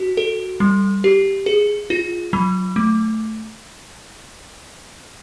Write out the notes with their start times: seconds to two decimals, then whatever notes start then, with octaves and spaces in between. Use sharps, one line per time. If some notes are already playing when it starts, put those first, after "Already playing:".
Already playing: F#4
0.17 A4
0.60 G3
1.04 G4
1.46 G#4
1.90 F4
2.33 F#3
2.76 A3